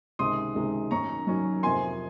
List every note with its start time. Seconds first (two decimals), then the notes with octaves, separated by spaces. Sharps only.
0.19 C#2 C3 D#3 G#3 C6 D#6
0.55 C#2 C3 D#3 G#3
0.91 F#2 D#3 F#3 C#4 A#5 C#6
1.27 F#2 D#3 F#3 C#4
1.63 F2 C3 F3 A#3 G#5 C6